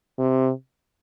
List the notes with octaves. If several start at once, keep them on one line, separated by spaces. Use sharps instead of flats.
C3